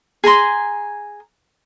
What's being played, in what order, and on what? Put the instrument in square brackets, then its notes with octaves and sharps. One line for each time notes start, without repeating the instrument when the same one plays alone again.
[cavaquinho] G#4 G#5 A#5 C6